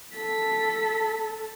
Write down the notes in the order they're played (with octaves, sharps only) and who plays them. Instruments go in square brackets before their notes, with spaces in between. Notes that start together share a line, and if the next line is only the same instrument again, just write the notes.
[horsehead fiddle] A4 [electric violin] B6